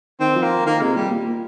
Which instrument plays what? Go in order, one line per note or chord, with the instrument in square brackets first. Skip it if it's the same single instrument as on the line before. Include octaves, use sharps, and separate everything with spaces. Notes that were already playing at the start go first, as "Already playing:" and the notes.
[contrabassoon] D#3 [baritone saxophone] C4
[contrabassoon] F3
[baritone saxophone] A#3
[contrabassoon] D#3 [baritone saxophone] A#3
[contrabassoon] C3 [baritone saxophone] G#3
[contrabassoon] A#2 [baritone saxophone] G3
[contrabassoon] A#2